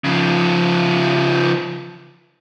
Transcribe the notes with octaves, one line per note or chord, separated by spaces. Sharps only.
C#3 F3